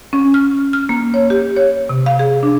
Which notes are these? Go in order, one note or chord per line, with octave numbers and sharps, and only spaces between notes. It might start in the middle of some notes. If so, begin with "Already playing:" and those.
C#4
F6
F6
A#3
C#5
G4
C#5
C3
F5
G#4
D4